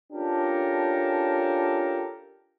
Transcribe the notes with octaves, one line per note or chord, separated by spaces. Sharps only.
C#4 D4 F4 G4 A4 A#4